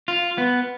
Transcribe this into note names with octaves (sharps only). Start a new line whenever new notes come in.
F4
B3